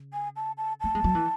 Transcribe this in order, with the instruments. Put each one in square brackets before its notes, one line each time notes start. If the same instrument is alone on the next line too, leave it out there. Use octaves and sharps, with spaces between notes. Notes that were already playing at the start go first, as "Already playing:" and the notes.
Already playing: [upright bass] C#3
[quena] G#5
A5
A5
[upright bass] A3 [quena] A5
[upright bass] G#3
F#3
E3